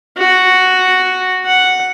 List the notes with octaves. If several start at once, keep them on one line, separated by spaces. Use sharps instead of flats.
F#4
F#5